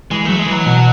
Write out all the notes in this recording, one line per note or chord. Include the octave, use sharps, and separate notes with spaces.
E3 G#3
F#3 A3
G#3
E3
F#3
B2
B2